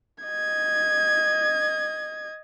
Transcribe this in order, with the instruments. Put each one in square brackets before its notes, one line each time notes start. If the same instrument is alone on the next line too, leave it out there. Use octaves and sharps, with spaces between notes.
[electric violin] D#5 G#6